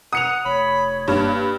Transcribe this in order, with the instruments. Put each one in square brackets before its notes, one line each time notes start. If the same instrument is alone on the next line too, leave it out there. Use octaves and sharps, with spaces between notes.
[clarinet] F#5 [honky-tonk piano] D#6 C#7 F7
[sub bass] F1 [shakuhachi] C#5 [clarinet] B5
[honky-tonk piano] G2 [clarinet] A#3